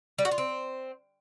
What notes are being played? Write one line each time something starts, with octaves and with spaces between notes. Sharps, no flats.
G3
F#4
F4
C4